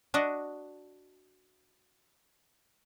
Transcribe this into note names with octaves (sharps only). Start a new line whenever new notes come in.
D4 F#4 D#5